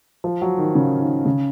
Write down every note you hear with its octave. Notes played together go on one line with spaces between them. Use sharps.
F3
F#3
D#3
C#3
D#3
C#3